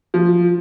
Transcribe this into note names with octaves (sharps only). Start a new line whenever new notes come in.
F3